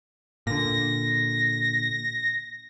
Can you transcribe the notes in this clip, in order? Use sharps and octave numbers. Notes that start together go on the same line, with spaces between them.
A#2 D3 A#6